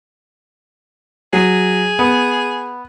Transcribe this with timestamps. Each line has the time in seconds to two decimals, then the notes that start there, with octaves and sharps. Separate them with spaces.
1.33 F#3 G#4
1.99 B3